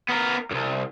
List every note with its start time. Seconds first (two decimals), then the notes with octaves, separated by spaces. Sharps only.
0.09 B3 A#4
0.51 C2 F#2